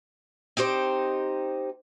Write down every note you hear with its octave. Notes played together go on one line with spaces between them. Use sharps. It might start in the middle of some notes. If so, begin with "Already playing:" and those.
C4 D#4 G4 C5